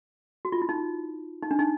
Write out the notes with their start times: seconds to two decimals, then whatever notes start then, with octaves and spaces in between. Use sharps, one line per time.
0.45 F#4
0.52 F4
0.62 E4
0.69 D#4
1.42 D#4
1.51 D4
1.59 D#4